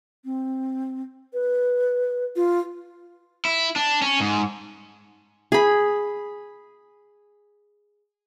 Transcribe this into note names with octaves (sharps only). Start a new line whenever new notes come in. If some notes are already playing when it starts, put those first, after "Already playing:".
C4
B4
F4
E4
D4
C#4
G#2
G#4 B5